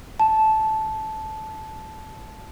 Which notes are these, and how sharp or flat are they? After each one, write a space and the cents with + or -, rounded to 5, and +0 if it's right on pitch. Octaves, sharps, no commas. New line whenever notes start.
A5 -10